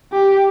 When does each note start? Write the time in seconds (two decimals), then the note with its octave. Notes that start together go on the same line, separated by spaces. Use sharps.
0.13 G4